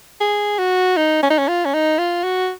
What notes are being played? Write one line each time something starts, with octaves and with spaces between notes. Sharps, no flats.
G#4
F#4
D#4
C#4
D#4
C#4
F4
C#4
D#4
F4
F#4